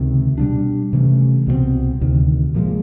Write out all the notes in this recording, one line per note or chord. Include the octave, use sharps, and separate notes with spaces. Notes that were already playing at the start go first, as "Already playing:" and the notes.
Already playing: C#2 C3 D#3
B2 G3 B3 D4
C3 E3 A3 C#4
C2 B2 G#3 C4
D2 C3 D#3
A#2 F3 G#3